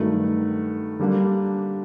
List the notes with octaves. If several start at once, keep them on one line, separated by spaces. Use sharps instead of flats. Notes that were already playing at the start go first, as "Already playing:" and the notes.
Already playing: G2 D#3 F#3 A3
D3 G3 A#3 D4